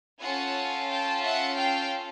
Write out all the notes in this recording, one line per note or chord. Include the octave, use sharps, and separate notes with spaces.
C#4 F4 A4 F#5 G#5
G5 A5
E5 F#5
F5 G5